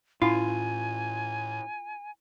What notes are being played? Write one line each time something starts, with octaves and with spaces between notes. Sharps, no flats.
A2 C#4 E4 F4 G#5